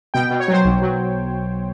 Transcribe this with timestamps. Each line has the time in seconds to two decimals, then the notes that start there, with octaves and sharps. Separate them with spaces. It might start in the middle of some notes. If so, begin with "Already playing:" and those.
0.14 B2 G5
0.31 B2
0.40 C#5
0.48 F#3 C5
0.64 B1
0.82 F#3